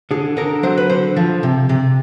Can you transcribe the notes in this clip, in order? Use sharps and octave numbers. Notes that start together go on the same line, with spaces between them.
D3 G#4
D3 A#4
F#3 C5
B4
D3 C5
F3
C3
C3